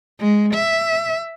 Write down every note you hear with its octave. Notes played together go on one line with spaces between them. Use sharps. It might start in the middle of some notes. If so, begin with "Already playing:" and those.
G#3
E5